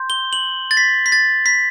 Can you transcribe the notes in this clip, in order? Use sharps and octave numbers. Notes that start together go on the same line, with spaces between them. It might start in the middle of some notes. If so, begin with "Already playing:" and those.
Already playing: C6 G6
G7
F#7
A6
B6
B6
A6
B6